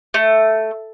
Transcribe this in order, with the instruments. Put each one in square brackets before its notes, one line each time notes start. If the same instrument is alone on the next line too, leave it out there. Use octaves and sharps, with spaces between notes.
[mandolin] A3